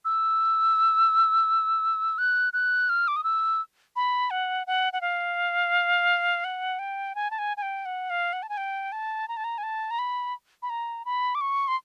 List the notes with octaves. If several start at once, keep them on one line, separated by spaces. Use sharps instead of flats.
E6
F#6
F#6
F6
D6
D#6
E6
B5
F#5
F#5
F#5
F5
F#5
G5
G#5
A5
G#5
G#5
G5
F#5
F5
F#5
A5
G#5
G5
A5
A#5
A5
A#5
G#5
A5
A#5
B5
B5
A#5
B5
D6
C#6
C6